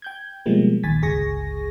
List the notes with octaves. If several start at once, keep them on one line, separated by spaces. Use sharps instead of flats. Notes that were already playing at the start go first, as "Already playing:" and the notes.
G5 G6 G#6
B2 F3 G3 G#3 A#3
A#1 D#2 G#5 A6 B6
G1 C#2 G#4 G#5 C#6 A#6